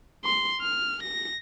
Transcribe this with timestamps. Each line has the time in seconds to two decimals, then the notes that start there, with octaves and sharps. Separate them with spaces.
0.25 C6
0.61 F6
1.02 A#6